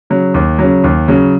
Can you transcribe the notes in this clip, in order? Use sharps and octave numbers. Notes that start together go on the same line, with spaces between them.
C#3 F#3
D#2
C#3 F#3
D#2
C#3 F#3